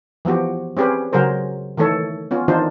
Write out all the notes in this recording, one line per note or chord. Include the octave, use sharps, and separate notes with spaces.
E3 F3 B3 F#4 G4
C4 C#4 G4 G#4 B4
C#3 F#3 G#4 A#4 C5
D#3 E3 A3 A4 C#5
B3 C#4 F4
D#3 E3 D4 D#4 F4 C5